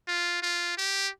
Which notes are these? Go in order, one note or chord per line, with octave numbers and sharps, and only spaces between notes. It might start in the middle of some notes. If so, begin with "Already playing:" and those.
F4
F4
G4